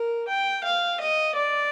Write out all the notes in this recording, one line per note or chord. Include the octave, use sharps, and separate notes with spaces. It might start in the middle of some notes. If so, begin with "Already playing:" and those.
Already playing: A#4
G5
F5
D#5
D5